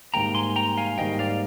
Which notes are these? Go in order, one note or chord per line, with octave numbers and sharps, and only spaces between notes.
G#2 D#3 G3 A#3 G5 A#5
G#5 C6
G5 A#5
F5 G#5
G#2 D#3 G3 A#3 D#5 G5
D5 F5